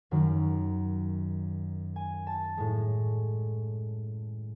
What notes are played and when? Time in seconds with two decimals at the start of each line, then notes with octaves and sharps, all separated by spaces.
0.11 F#2 D#3 F#3
1.96 G#5
2.27 A5
2.57 A2 G#3